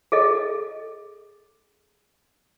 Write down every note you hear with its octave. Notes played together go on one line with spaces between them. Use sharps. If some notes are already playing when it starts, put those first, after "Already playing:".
G#4 A4 D#5